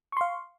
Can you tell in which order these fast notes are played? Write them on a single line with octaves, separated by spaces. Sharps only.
C#6 C6 F5